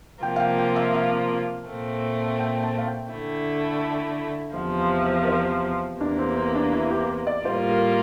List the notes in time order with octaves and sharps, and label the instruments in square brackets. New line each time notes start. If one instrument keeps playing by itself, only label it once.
[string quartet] C3 F3 A#3 F4 [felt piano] G5
[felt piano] F5
G5
G5
E5
F5
[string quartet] A#2 A3 C4
[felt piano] G5
A5
F5
G5
[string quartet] D3 A3 E4
[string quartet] E2 C3 F3 [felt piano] F5
[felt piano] E5
E5
A#4
C5
[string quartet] E2 C3 E3 A#3 [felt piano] D4
[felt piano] C4
C4
D4
E4
G4
D5
[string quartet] A2 G3 A#3 F4 [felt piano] C5
[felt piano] A#4